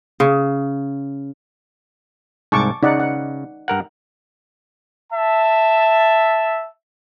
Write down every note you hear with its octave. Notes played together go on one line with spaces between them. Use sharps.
C#3
C2 G#2 A5 C#6 D6
C#3 D#4 D5 F#5
F#5
G2 A#4 F#5
E5 A5